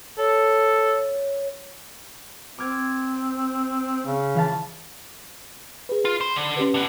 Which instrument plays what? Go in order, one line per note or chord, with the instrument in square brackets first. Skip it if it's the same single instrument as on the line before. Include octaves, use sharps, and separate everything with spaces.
[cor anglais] A4 [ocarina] C#5
[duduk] C4 [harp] D6 F6 G#6
[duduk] C#3
[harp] E3 F5 A5
[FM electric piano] G#4 B4
[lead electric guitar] F4
[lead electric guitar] C5 [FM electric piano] B5
[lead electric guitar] D3
[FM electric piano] C#4 G4 B4
[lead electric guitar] D3 B3